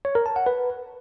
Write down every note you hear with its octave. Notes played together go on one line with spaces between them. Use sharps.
C#5
A#4
A5
F#5
B4